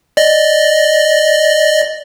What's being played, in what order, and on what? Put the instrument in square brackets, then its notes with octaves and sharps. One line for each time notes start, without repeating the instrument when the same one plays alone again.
[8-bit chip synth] D5 D#5